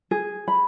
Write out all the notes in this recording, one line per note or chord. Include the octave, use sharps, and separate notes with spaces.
G#4
B5